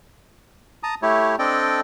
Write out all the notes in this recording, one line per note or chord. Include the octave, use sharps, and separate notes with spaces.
A5 A#5 D#6
A3 E4 G4 C#5
C4 D4 A4 D5 D#5 G5